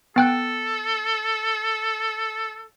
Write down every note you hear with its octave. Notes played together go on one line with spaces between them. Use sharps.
B3 A4 G5 F#6